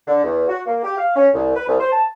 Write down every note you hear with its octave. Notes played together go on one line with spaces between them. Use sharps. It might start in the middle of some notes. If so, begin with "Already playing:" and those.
D3
E2
F#4
A#3
G4
F5
C#4
C2
B4
C2
C5
A5